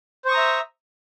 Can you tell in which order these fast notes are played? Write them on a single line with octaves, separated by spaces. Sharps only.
C5 C#6 D#6 A#5 E5